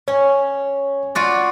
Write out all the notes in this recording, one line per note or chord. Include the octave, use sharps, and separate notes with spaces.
C#4 C#5
F4 F#4 D5